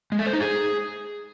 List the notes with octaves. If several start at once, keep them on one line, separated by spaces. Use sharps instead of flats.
G#3
A3
C5
D#4
G#4